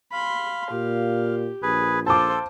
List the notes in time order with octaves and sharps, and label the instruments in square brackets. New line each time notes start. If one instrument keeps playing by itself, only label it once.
[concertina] F5 [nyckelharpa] B5 C6
[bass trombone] A#2 [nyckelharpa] G4
[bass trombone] A#1 [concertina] G#4 B4
[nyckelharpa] F4 C5 [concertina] A4 [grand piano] A5 D6